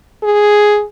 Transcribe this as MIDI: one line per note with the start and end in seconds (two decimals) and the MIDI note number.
0.23 0.84 68